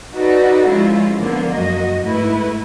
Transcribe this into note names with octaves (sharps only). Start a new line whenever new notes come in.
D#4 F#4 A4 B4 D5
F3 G#3 C#4 E4 F4
D3 F3 A#3 B3
F#2 F#4 D#5
G#2 A3 E4 B4